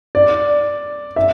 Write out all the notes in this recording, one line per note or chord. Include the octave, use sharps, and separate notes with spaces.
D5
E5